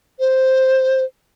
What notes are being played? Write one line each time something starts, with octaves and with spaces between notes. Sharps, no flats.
C5